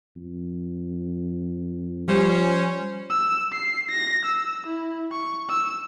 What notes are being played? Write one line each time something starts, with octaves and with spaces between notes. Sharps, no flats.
F2
F3 G3 C#4 C5
E6
C7
A#6
E6
E4
C#6
E6